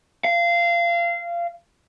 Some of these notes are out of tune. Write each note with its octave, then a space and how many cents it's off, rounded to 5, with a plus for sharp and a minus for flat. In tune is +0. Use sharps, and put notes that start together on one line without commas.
F5 -20